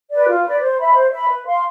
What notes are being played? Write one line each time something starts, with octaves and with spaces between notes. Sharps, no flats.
B4 D5
F4
B4 D5
C5
E5 B5
C5
E5 B5
B4
F5 C6